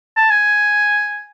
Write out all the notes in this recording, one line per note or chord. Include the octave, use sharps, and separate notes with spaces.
A5
G#5